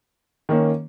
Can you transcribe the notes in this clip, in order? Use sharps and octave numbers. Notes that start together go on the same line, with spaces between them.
D#3 A#3 C#4